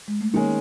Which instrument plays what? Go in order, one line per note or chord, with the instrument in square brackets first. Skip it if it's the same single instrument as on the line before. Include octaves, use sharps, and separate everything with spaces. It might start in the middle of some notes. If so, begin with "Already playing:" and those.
[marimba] G#3
A3
[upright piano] D#3 G#3 C#4 [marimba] A#3